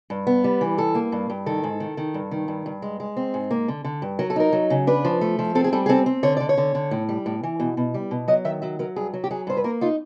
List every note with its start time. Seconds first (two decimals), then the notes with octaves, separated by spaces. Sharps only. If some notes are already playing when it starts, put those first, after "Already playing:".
0.10 G2
0.27 B3
0.44 G3
0.61 E3
0.78 G2 A4
0.95 A#3
1.12 G2
1.30 G2
1.46 D#3 A4
1.64 G#2
1.80 D#3
1.97 D#3
2.14 G2
2.31 D#3
2.48 G2
2.66 G2
2.82 G#3
3.00 G#3
3.17 C4
3.34 G#2
3.51 A#3
3.68 D3
3.85 D3
4.02 G2
4.19 F#3 A#4
4.30 A4
4.36 D#4 A#4
4.53 F#3
4.70 C#3
4.87 D4 B4
5.05 F3
5.21 A3
5.39 F3
5.55 C4 A4
5.64 G#4
5.72 G3 A4
5.86 G#4
5.89 C4 A4
6.06 C4
6.23 D3 C#5
6.37 D3 D5
6.49 C#5
6.58 D3
6.75 D3
6.91 A2
7.09 G3
7.26 A2
7.43 E3
7.60 B2
7.77 B2
7.94 G3
8.11 B2
8.28 F#3 D#5
8.45 D#3 E5
8.62 F#3 E5
8.79 F#3 A#4
8.96 G2 G#4
9.14 F#3
9.24 G4
9.31 F#3 G#4
9.47 G2 C5
9.57 B4
9.64 A#3 A#4
9.81 D#4 F4